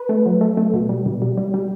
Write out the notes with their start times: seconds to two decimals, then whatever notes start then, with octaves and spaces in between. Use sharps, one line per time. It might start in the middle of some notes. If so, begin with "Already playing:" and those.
Already playing: B4
0.09 A3
0.26 F#3
0.41 A3
0.57 A3
0.74 B2
0.89 G3
1.06 B2
1.22 G3
1.37 G3
1.54 G3